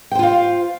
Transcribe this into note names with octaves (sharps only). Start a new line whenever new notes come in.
F4 C5 F5 G5